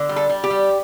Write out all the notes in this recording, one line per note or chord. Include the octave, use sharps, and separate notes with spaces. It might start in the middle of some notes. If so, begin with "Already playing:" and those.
Already playing: D3
G3
A4
G3
G4
G3